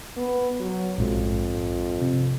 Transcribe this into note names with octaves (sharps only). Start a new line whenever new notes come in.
B3
F#3
A#1 F2 G#2
C3